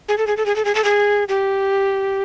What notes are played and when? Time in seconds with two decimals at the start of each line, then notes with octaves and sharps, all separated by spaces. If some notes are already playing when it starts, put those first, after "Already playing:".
0.08 G#4
0.18 A4
0.27 G#4
0.37 A4
0.46 G#4
0.56 A4
0.65 G#4
0.75 A4
0.84 G#4
1.29 G4